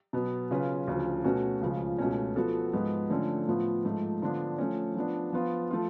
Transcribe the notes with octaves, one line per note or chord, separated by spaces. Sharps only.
B2 F#3 B3
C#3 F#3 C#4 F4 B4
D2 C#3 F3
B2 A3 C#4 F#4 B4
C#2 C#3 F3
C#2 B2 A3 C#4
F3 B3 F#4 A4
G#2 F3 B3
D3 F3 A3 C#4
A2 F3 B3 F4
G#2 F3 A3
D3 F3 B3 D4 F4
F3 A3 C#4
F3 B3 D4
F3 B3 F4
F3 A3 F4